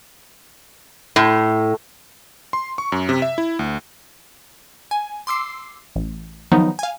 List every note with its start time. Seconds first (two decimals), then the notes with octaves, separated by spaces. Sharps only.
1.16 A2
2.53 C6
2.78 C#6
2.92 F#2
3.09 C3
3.22 E5
3.38 E4
3.59 D2
4.91 G#5
5.27 C6 D6 E6 C7
5.96 A1
6.52 D#3 F3 F#3 B3 D#4
6.79 F5 G#5